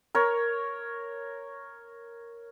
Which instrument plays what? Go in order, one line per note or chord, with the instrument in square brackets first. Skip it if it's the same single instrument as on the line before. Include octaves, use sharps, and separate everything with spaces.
[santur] A#4 C#5